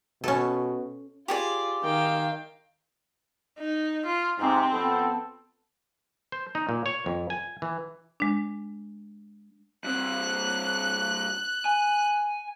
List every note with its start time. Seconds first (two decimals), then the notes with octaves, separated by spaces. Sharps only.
0.24 B2 C#4 A4
1.28 F4 G4 G#4 D5
1.84 D#3 F5 G5
3.59 D#4
4.06 F4
4.40 G#2 C3 C4
4.72 F2 B3 A4
6.32 C5
6.55 D#4
6.69 A#2
6.86 C#5
7.06 F2
7.30 G#5
7.62 E3
8.20 G#3 D4
9.85 G2 C4 F#6
11.66 G#5